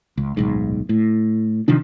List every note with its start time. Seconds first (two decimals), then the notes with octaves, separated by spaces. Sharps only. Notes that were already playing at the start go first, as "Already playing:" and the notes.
0.17 C#2
0.37 D1 B1 G#2
0.89 A2
1.68 C3 D#3 F3 D4